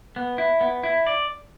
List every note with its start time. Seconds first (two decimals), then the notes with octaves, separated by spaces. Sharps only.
0.16 B3
0.38 E4
0.61 B3
0.83 E4
1.07 D5